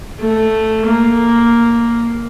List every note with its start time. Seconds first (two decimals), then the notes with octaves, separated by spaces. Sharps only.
0.20 A3
0.85 A#3